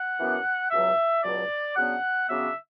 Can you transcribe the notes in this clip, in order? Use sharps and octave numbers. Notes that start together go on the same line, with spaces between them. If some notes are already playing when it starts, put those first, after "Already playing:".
Already playing: F#5
F#2 E3 B3 D4
C#2 B2 F#3 E5
C#2 B2 F#3 D5
C#3 F#3 B3 D4 F#5
C#3 F#3 B3 D4 E5